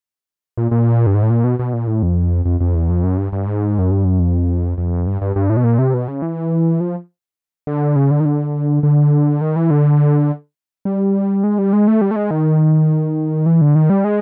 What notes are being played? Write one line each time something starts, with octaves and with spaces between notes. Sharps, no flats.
A#2
A#2
G2
G#2
A2
A#2
B2
B2
A#2
A2
F2
F2
F2
E2
F2
F#2
G2
G2
G#2
F#2
G2
F#2
F2
F2
G2
G2
G2
A2
B2
A#2
C3
B2
C#3
E3
F3
D3
C#3
D3
D#3
D3
D3
D#3
E3
D3
G3
G#3
G3
G#3
A3
G3
A3
G#3
D#3
E3
D3
D#3
G3
G#3